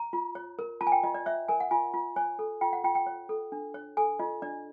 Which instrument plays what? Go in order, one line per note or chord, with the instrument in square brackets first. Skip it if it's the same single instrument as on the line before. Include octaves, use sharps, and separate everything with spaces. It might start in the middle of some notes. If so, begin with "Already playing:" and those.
Already playing: [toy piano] A#5
F4
C#5
A#4
F4 A5
G#5
G5
F4 D#5
D5
C#5 E5
A#4 G#5
F#5
F4 G#5
F4
C#5 G#5
A4
F4 G5
F#5
F4 G5
G5
C#5
A4
D4
C#5
A4 G#5
F4 D#5
D4 D5